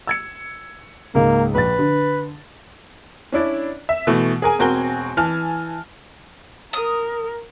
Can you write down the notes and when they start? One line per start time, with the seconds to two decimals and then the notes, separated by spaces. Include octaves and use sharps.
0.07 E6 G#6 C#7
1.15 C#2 G#2 A#3
1.55 A#1 B4 A6
1.79 D3
3.32 C#4 D4 E4 D5
3.89 E5
4.07 B2 E3 A3
4.42 G#4 A#4 G#5
4.59 E1 C4 F#4 A#4 G#5 G7
5.17 E3 G#5 A5 F6
6.73 A#4 D#6